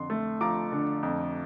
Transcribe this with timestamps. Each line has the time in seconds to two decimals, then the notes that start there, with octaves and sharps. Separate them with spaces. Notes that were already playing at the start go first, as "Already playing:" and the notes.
Already playing: F2 D3 C6
0.10 A3
0.41 F3 A#5 D6
0.72 D3
1.03 F2